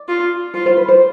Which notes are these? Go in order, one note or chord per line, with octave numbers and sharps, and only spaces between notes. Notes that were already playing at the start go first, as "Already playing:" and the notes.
Already playing: D5
F4
F4 C5
C5
B4
C5